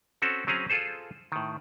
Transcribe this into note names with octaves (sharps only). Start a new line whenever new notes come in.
C4 C#4 F#4 A4
F#3 C4 C#4 G#4 A#5
F4 G#4 A4 C5
A2 D#3